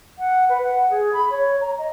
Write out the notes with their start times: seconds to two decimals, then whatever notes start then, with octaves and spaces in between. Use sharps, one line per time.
0.19 F#5
0.49 B4
0.63 F#5
0.90 G#4
1.13 B5
1.30 C#5
1.61 A#5
1.78 D#5